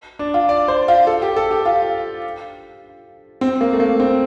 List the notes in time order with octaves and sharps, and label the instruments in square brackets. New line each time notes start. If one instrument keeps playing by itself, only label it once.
[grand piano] D4
F4
D5
C5
F4
A4
G4
A4
G4
F4
C4
A#3
A3
A#3
C4